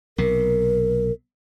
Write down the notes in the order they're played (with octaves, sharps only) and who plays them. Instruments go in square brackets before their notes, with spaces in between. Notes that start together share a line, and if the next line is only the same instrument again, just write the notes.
[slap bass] B1 C3 [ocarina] A#4